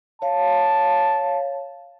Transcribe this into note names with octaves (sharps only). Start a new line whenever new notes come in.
C#5 F5 A5